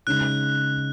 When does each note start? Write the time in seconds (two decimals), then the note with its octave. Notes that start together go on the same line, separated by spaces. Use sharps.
0.07 C#3 G#3 D#4 F#6